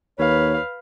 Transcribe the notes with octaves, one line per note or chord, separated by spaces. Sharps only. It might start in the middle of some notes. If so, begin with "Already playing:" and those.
D#2 B4 C#5 F5